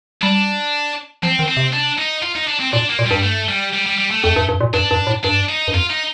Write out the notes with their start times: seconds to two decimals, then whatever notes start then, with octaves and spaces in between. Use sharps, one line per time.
0.22 G3 D4
1.23 F3 C4
1.39 D#3
1.48 C4
1.57 C3
1.74 D4
1.99 D#4
2.22 F4
2.36 D#4
2.48 D4
2.60 C4
2.73 A#2 D4
2.90 A#3
2.99 A#2
3.06 G2 G3
3.24 A3
3.49 G3
3.73 G3
3.86 G3
3.98 G3
4.11 A3
4.24 F2 A3
4.36 G2
4.49 G2
4.61 A#2
4.74 G2 D4
4.91 G2
5.07 A2
5.24 G2 D4
5.49 D#4
5.68 G2
5.73 F2 F4
5.90 D#4